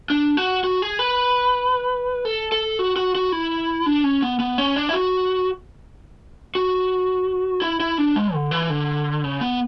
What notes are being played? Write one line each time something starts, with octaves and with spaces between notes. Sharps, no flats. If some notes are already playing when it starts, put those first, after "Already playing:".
D4
F#4
F#4
G#4
B4
A4
A4
F#4
F#4
F#4
E4
D4
C#4
B3
B3
C#4
D4
E4
F#4
F#4
E4
E4
D4
G#3
D3
E3
D3
C#3
B3